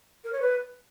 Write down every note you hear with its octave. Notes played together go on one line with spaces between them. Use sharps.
A#4
C#5
B4